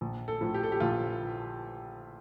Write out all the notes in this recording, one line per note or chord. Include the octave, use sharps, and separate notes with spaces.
A#1
A4
A2 F3
G4
A4
G4
A#1 F4